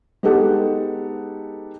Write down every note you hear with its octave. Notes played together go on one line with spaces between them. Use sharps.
G#3 B3 D#4 G4 A4 F#5